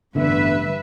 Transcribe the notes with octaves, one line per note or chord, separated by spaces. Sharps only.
A1 G2 D3 B3 B4 E5